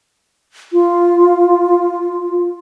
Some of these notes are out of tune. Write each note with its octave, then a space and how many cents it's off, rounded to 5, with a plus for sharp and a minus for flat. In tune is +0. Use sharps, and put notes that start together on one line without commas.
F4 +0